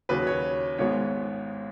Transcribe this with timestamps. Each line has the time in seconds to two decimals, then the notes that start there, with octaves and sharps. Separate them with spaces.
0.09 D#2 C#3 F#3 B4
0.27 C#5
0.78 G#1 G#2 G#3 B3 C#5